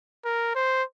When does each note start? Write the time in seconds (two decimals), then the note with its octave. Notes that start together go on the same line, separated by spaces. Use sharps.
0.25 A#4
0.55 C5